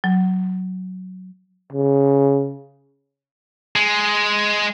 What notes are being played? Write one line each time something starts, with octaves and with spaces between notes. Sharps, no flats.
F#3
C#3
G#3